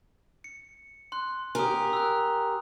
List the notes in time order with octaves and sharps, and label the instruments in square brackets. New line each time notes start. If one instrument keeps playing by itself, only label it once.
[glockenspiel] C#7
C6 F#6
[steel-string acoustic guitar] G4 A#4 [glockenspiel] G#5 D#6
[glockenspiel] E6 F#6